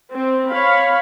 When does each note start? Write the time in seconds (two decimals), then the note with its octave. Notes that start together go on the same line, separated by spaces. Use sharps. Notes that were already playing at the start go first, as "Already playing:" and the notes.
0.11 C4
0.51 C#5 F5 B5